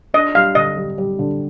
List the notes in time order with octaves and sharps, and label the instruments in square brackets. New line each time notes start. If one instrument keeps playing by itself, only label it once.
[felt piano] D4 [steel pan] D#5
[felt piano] G3 [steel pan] F5
[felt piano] D3 [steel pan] D#5
[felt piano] G3
G3
D3